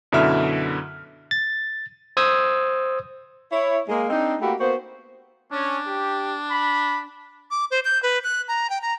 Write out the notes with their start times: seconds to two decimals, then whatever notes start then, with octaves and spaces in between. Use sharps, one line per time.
0.12 F#2 B2 D3 E4 E5 F6
1.31 A6
2.17 C5 D#6 E6 G#6
3.52 E4 C#5
3.89 G#3 A#3
4.10 C4 D4 D#4
4.41 A3 A#3 E4 F#4 G4
4.59 A#3 B3 F#4 C5
5.52 C#4 D4
5.87 G4
6.52 B5
7.51 D6
7.71 C5
7.85 G6
8.03 B4
8.24 F#6
8.48 A#5
8.70 G5
8.82 A#5